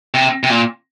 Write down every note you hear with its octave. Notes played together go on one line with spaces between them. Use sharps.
C3
C3
A#2